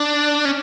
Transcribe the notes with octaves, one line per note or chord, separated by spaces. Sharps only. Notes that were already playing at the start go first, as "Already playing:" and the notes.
Already playing: D4
C#4